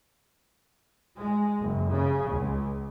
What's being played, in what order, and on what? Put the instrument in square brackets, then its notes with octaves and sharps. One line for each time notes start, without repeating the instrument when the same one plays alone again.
[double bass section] G#3
F#1
C#3
C#2